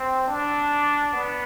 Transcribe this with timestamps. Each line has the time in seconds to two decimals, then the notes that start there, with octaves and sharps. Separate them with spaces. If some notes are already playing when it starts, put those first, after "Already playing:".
Already playing: C4
0.27 D4
1.13 B3